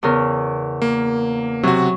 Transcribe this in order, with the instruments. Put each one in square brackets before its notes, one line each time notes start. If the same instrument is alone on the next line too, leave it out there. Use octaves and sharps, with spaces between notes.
[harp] E2 C#3 A#4
[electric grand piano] A#3
[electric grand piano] C3 F#4 [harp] F#3